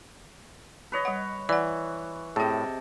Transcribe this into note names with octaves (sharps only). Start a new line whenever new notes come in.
B4 C#5 D#5
G3 F#5
E3 D5 F#5
A2 C3 G#4 D#5 G5 A5